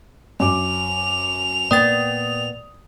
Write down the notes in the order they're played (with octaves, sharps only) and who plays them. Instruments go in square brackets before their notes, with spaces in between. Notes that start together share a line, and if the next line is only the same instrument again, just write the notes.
[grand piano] F#2 D6 [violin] F7
[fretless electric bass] A#2 A#3 B3 [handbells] D5 G5 A6 [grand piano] D#6